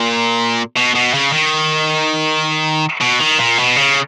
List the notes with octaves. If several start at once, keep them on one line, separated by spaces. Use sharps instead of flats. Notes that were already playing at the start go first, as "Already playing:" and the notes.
Already playing: A#2
B2
B2
C#3
D#3
B2
D#3
A#2
B2
C#3